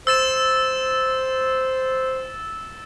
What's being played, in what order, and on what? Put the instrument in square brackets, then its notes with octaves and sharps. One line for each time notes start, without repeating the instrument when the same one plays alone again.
[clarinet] C5 [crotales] E6 A6 E7